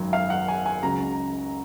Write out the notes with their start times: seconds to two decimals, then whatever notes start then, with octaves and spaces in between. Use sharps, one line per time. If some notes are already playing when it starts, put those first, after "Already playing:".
Already playing: G#1 F#2 D#3 F#3
0.13 F5
0.30 F#5
0.48 G#5
0.66 G#5
0.83 C#2 C#3 F#3 A#5